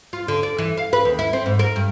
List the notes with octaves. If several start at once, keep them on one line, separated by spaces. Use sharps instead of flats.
F4
D3
D5
E3
F5
B4
D#2
E4
C4
G#2
A#4
G2